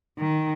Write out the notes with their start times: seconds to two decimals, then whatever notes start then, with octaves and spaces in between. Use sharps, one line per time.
0.18 D#3